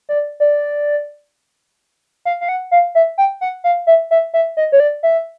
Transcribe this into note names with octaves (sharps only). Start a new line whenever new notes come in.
D5
D5
F5
F5
F#5
F5
E5
G5
F#5
F5
E5
E5
E5
D#5
C#5
D5
E5